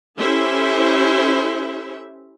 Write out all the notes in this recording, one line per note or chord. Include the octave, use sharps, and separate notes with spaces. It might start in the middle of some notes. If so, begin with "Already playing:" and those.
C#4 E4 G4 A4 C5 E5